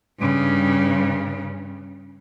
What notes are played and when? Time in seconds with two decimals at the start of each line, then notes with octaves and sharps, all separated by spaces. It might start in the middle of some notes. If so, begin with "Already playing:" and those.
0.20 G2 C#3